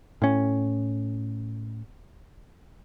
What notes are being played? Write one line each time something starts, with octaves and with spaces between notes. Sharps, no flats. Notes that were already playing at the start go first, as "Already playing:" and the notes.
A2 C#4